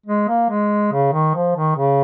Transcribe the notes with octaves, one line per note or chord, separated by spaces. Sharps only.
G#3
A#3
G#3
C#3
D#3
F3
D#3
C#3